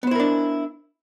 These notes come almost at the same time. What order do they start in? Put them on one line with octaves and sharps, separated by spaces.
B3 C5 E4 A#4 D4